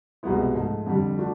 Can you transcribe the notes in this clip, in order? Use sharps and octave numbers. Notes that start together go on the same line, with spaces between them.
C2 B2 G#3 B3 E4
G#2 F3 A3
F2 D3 G3
A3 D4 F#4